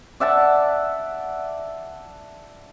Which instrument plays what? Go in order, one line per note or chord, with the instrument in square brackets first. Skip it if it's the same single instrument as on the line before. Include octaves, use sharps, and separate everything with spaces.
[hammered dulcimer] D5 E5 F#5 A5